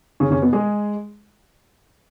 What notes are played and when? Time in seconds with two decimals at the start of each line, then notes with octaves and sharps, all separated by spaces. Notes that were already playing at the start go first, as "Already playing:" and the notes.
0.20 C#3 C#4
0.31 C#3 C#4
0.42 B2 B3
0.53 G#3 G#4